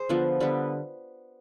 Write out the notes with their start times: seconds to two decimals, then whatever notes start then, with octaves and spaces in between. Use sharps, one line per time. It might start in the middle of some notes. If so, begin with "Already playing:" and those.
Already playing: G#4 C5
0.09 D3 F3 B3
0.40 D3 G3 B3